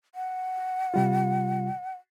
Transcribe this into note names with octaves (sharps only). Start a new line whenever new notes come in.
F#5
C3 G3 F4